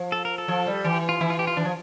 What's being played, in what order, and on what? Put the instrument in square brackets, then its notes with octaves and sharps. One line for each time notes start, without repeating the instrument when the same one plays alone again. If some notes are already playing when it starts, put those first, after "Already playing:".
Already playing: [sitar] F3
[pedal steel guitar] A4
A#4
A4
[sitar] F3
G3
[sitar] E3 [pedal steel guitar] G4
[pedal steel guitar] F4
[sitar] E3 [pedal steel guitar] E4
[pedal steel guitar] F4
G4
F4
[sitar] E3 [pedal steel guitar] D4
[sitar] F3